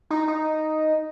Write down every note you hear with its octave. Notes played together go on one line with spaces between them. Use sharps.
D#4
D#4